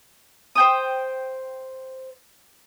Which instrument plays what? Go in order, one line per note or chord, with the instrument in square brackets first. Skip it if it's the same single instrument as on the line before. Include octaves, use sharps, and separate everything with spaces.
[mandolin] C5 G5 D#6